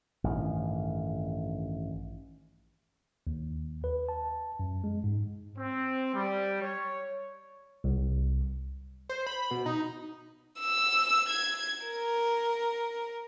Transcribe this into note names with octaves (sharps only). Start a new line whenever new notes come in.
A1 G2 D#3
D#2
B4
A5
F#2
G#3
G#2
C4
G3
C#5
C2
C5
B5
B2
D#4
E6
G#6
A#4